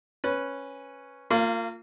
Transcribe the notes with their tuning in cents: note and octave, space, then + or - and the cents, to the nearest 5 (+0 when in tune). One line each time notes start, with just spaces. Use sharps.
C#4 -5 B4 +0
A#3 -30 F4 +0